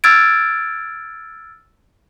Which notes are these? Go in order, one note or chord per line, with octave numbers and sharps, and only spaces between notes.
E6 F6 G#6 A6 D7